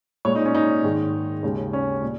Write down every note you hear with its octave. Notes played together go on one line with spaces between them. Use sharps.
A#2 G#3 C#5
D#4
C#4
D#4
G#2 D#3 G#3
D#2 C#3 G#3
C#4
A#2